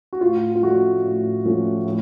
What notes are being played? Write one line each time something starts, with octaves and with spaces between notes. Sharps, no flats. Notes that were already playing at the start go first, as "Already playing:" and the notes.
F#4
A2 F4
F4
F3 A3 C#4 F#4
A2
F3 A3 C#4
A2